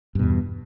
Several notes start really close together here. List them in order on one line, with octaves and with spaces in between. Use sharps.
G2 B2 E2